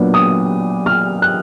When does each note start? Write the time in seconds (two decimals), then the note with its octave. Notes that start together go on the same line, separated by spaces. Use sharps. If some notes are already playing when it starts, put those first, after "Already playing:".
Already playing: A#2 F#3 B3 D4
0.14 D#6
0.86 F6
1.22 F#6